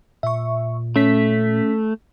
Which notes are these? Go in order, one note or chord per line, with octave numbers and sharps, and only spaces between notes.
A#2 E5 C#6
A3 C#4 B6